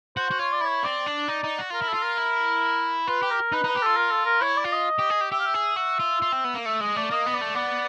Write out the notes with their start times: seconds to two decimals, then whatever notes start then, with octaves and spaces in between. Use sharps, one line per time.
0.16 F#4 C5
0.31 F#4
0.39 F4 C#5
0.52 D5
0.61 E4 C#5
0.83 C4 D5
1.06 D4
1.28 D#4
1.44 D#4
1.58 F#4
1.70 F4 A#4
1.82 E4
1.89 A4
1.94 F4
2.03 A#4
2.18 E4
3.08 F4 B4
3.23 G4
3.30 A#4
3.53 D#4 B4
3.64 D#4 B4
3.75 G4
3.82 F4 A4
3.97 A#4
4.11 A4
4.25 A#4
4.41 E4 C#5
4.57 D5
4.64 F4
4.72 D#5
4.99 G4
5.10 G#4
5.21 G4
5.32 G4 E5
5.39 F5
5.46 E5
5.54 G#4
5.76 F#4 E5
6.00 F4
6.22 F4
6.32 C4
6.44 B3
6.54 A#3
6.66 A3 E5
6.81 G#3 D#5
6.96 A3 D5
7.11 A#3 D#5
7.26 B3
7.33 D5
7.41 A3
7.55 B3 D5